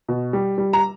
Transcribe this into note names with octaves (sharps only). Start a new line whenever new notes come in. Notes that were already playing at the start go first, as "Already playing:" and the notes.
B2
G3
G3
A#5